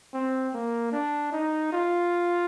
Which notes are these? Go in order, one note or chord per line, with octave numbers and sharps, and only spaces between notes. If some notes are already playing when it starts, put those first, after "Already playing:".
C4
A#3
D4
D#4
F4